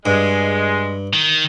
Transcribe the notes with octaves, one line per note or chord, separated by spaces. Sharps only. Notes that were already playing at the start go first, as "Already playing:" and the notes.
G2 G#3
D#3